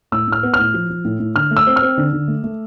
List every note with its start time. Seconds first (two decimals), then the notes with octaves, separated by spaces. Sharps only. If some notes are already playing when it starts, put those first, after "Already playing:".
0.12 A2 E6
0.28 A2 F6
0.43 B3
0.54 F6
0.59 A2
0.74 F3
0.90 F3
1.05 A2
1.20 A2
1.35 D3 F6
1.51 A3
1.57 E6
1.67 C4
1.76 F6
1.82 C4
1.97 D3
2.13 D3
2.28 A3
2.44 A3